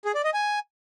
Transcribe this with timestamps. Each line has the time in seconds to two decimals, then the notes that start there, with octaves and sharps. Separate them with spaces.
0.05 G#4
0.15 D5
0.24 D#5
0.34 G#5